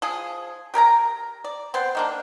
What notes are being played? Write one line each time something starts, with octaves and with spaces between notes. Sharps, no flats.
F3 G#4
G4 A#4 G#5 A#5
D5
B3 C4 C5
D#3 A#3 D4